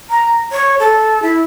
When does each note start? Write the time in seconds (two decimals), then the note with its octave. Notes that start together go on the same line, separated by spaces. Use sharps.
0.10 A#5
0.52 C#5
0.79 A4
1.23 E4